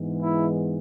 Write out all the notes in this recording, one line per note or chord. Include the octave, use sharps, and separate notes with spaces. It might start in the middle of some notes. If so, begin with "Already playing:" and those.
Already playing: G#2 E3 G#3 B3
E4